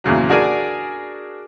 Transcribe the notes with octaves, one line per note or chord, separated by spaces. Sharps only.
E2 A#2 C#3 F#3
D4 F#4 G#4 A#4 D5 G#5